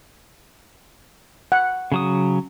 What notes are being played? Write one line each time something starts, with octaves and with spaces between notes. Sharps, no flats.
F#5
C#3 F#3 D#6